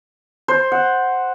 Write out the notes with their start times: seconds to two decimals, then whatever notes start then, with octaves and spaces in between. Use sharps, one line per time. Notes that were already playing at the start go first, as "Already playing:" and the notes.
0.48 C5
0.72 F#5